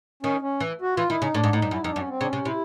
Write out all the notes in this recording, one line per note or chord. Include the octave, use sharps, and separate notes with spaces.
D#3 C#4
C#4
E3
F#4
E3 F4
D#3 E4
C#3 D#4
A2 D4
G#2
A2 D#4
G2
F#2 E4
F2 D#4
D4
F#2
C#4
C4
C#3 D4
C#4
C3
C3 E4